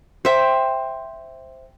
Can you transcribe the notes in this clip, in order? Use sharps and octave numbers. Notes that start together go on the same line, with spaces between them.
C5 E5 G5